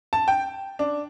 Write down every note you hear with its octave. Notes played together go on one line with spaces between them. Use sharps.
A5
G5
D4